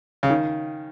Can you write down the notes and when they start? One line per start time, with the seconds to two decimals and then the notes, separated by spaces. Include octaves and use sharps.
0.23 C#3
0.30 D#3